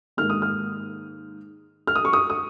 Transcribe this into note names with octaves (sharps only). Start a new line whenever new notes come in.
G#2 D#3 A#3 F6
D#6
F6
F6
D#6
C#6
D#6
D#6